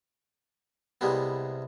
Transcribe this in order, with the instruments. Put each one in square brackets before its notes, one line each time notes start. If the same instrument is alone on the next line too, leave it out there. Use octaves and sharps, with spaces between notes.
[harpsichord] C2 C3 G3 G#3 B3